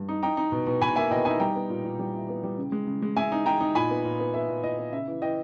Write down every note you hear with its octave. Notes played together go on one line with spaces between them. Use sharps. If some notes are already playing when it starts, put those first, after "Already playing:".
Already playing: G2
D#4
D#4 G5 A#5
D#4
B2
B2
B2 G#5 B5
A#3 E5 G#5
B2 D#5 G5
D#4 E5 G#5
G3 G5 A#5
B3
A#2
A#2
G3
E4
B3
G3
C#3
G#3
C#3
G#3
G#3 E5 G#5
D#4
D#4 G5 A#5
D#4
A#2 G#5 B5
B3
A#2
B3
B3 E5
A#2
A#2 D#5
B3
C#3 E5
E3
E3 D#5 G5